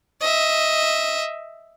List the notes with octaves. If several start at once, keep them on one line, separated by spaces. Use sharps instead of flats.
D#5 E5